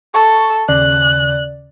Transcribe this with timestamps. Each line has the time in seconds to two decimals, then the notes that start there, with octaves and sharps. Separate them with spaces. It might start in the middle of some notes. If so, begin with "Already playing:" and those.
0.14 A4 C#6
0.68 D#2 C#3 D5 F#6